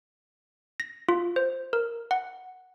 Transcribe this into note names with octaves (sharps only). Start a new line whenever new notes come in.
A#6
F4
C5
A#4
F#5